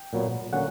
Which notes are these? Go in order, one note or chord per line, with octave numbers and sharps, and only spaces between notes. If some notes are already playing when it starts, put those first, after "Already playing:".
Already playing: G5
A#2 F#3 B3
D3 F#3 A#3 C#4 F#5